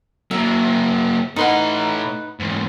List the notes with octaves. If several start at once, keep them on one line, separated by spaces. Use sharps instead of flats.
F#3 A#3 E5 A#5
A2 D#4 B4 F#5 C6
G#2 E3